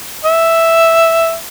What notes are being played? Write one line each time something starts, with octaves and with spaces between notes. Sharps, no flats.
E5